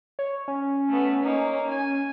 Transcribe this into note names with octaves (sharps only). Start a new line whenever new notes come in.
C#5
C#4
A3 B3
A#3 D#4
G#5